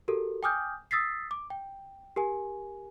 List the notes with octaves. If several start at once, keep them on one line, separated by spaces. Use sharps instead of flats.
F#4 G4 A4 A#4
G5 G#5 D6 D#6 F6 G6
D#6 E6 A6 B6 C7
D6
G5
G4 A#4 G#5